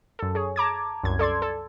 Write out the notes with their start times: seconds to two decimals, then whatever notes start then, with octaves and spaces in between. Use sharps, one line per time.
0.19 F#2 A4
0.35 G#4 C#5
0.56 A5 A#5 D6 G#6
1.04 C2 F#2 G#6
1.19 A4 D5 C6 G#6
1.42 A4